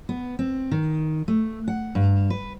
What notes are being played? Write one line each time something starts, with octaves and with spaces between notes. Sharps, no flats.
B3
C4
D#3
A3
F#5
G2
B4